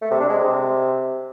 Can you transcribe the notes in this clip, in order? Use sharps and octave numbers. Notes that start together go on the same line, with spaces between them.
A3
C3
D4
G#3
C3